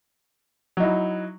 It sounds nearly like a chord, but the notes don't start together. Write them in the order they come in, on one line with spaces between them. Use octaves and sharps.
F#3 D#4 E4